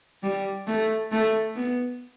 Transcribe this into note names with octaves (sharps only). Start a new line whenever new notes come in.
G3
A3
A3
B3